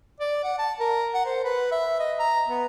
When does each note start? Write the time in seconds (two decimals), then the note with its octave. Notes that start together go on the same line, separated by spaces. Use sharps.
0.21 D5
0.44 F#5
0.59 A5
0.80 A#4
1.14 F#5
1.26 C5
1.45 B4
1.72 E5
2.00 D#5
2.19 A#5
2.49 B3